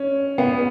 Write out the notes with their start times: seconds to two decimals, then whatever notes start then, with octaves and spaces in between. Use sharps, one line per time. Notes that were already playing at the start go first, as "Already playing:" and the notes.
Already playing: C#4
0.38 B3